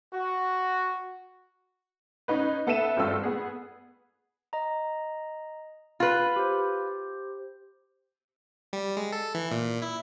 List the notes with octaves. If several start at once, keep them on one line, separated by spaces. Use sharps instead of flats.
F#4
C#4 D#4 B4
B3 A4 B4 E5 D#7 E7
G#1 G2 C4 F4 A4 E6
B3 G#4
D#5 A#5
F4 B4 B5
G4 C5
G3
G#3
A4
E3
A#2
E4